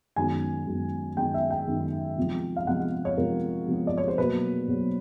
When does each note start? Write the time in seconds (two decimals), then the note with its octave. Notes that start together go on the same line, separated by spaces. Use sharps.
0.16 F#2 D#3 G#3 B3 G#5
0.67 F#2 D#3 G#3 B3
1.17 F#2 D#3 G#3 B3 G5
1.34 E5
1.50 G5
1.67 F#2 D#3 G#3 B3
2.18 C3 F3 G#3 B3
2.56 F5
2.67 C3 F3 G#3 B3 F#5
2.80 F#5
3.05 C#5
3.18 C3 F3 G#3 B3 A#4
3.68 C3 F3 G#3 B3
3.87 D5
3.98 C#5
4.08 C5
4.18 B2 F#3 A#3 B4
4.68 B2 F#3 A#3